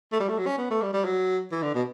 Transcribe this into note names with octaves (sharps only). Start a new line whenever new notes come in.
A3
G3
A3
F#3
C#4
B3
A3
G3
G3
F#3
E3
D3
B2